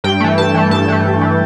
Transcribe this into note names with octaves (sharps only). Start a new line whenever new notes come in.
G2 G5
E3 A3
G2 A5
E3 A3
G2 A5
E3 A3
G2
E3 A3